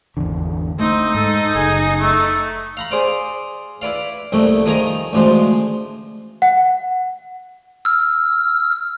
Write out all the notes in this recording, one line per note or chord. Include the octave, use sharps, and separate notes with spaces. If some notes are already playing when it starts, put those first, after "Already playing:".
G#1 E2 D3
A3 C4 D#4
G#2 A4
F#1 G#4
A3
F5 A#5 B5
G#4 C5 D5 F5
E4 B4 D5 F5
C2 F2 A#2 A3
D#3 F3 G#4 G#5 A#5
A1 D2 F3 G#3 C5
F#5
E6 F6